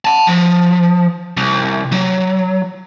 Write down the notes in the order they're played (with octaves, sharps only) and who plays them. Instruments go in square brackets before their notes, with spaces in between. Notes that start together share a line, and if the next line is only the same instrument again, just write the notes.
[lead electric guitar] F#5 A5
F3
C2
F#3